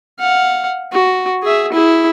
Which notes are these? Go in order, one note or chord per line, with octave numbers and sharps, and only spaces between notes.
F5 F#5
F#4
G#4 E5
E4 G#4